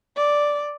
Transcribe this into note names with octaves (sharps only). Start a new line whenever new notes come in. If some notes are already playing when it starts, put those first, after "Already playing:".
D5